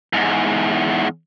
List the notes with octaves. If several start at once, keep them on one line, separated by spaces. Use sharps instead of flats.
E2 G#2